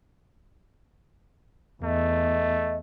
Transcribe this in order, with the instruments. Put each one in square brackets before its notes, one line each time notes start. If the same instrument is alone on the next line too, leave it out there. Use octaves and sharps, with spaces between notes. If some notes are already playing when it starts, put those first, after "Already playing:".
[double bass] E2 [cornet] A3 [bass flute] D#5